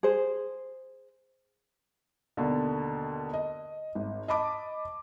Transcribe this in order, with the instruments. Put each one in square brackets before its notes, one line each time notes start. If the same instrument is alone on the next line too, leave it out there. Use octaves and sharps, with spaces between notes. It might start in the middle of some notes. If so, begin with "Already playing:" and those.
[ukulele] G#4 C5
[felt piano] D#2 B2 D3
D#5
G#1
D#5 A5 B5 D6